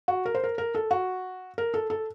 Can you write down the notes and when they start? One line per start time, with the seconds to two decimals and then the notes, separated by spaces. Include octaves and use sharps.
0.08 F#4
0.26 A#4
0.35 C5
0.44 A#4
0.58 A#4
0.75 A4
0.91 F#4
1.58 A#4
1.74 A4
1.90 A4